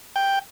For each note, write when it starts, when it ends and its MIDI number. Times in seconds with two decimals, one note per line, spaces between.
0.16 0.39 79